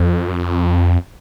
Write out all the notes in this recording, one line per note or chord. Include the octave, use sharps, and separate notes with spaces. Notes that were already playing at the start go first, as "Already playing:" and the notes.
Already playing: F2
F#2
F2